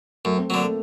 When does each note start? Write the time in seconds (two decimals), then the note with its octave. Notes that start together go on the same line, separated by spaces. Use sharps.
0.25 F#2 A3
0.38 C4
0.50 D3 F#3 A#3
0.63 A3